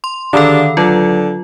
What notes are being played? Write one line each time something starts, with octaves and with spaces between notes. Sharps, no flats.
C6
D3 D#3 D4 A4
D3 F#3 F4